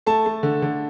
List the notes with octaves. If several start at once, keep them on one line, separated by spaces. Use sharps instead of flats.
A3 A5
A3
D3
D3